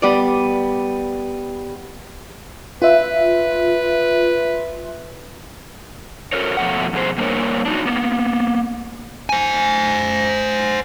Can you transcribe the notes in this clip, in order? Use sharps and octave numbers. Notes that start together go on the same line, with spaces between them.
G3 B3 D5
F4 B4 E5
F#4 A4 A#4 C#5
F2 B2 A3 F#5
F2 B2 G#4 C5
G3 A#3 D4 A4 A#4 C#5
D4 D#4 F#4
A#3 B3
C5 G#5